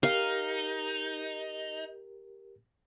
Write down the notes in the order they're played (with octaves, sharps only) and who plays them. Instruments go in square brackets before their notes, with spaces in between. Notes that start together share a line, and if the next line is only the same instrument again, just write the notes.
[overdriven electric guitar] D#4 [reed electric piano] G4 A#4 [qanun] F5